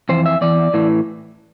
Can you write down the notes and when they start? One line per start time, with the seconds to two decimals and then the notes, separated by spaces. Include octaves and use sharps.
0.09 F2 E3 C5
0.26 E5
0.41 E2 E3 D5
0.74 A2 E3